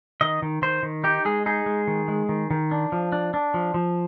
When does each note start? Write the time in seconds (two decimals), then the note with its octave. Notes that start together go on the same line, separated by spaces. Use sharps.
0.21 D#3 D#5
0.42 D#3
0.62 D#3 C5
0.83 D#3
1.04 D#4 G4
1.25 G#3 G#4
1.46 D#4 G#4
1.66 G#3
1.87 D#3
2.08 G#3
2.29 D#3
2.51 D#3
2.71 D4
2.92 F3
3.12 D4
3.34 D4
3.54 F3
3.74 F3